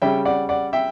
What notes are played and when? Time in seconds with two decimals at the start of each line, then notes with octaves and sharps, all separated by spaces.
0.02 C#3 G3 C#4 E5 G5
0.25 D5 F#5
0.49 D5 F#5
0.73 E5 G5